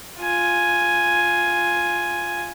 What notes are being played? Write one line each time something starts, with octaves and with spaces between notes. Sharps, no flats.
F4 G#5